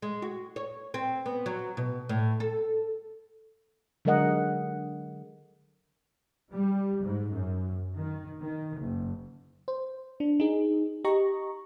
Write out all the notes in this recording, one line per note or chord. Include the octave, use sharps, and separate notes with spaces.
G#3
F#4
C#5
C4
B3
F#3
B2
A2
A4
D3 F#3 G#3 A#4 D#5 F#5
G3
G#2
F#2
D#3
D#3
F#1
C5
D4
D#4 G#4
G4 D#5 A#5 C#6